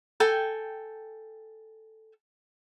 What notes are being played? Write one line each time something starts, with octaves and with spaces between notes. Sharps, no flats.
A4 G5 G#5